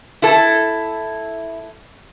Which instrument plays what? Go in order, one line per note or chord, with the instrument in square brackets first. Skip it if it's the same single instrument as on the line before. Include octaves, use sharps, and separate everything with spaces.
[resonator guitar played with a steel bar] E4 A4